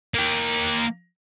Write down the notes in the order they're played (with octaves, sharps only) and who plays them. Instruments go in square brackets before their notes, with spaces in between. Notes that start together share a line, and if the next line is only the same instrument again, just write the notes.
[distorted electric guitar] A#3 G5